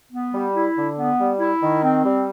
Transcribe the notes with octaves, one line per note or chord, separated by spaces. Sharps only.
B3
G3
E4
D3
B3
G3
E4
D#3
C4
G3